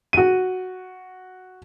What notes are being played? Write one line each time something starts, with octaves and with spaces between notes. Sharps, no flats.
F#4 D#7